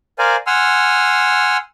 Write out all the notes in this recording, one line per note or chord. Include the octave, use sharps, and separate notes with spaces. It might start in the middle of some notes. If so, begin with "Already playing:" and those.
A#4 C5 D5 F5 G#5
F#5 G#5 C6 E6 F6